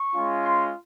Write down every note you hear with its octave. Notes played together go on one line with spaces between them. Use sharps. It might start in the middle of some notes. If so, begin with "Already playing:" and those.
Already playing: C#6
G#3 C#4 F4
C6